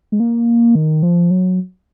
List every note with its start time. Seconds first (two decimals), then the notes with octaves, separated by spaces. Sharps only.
0.12 G#3
0.20 A#3
0.75 D#3
1.03 F3
1.31 F#3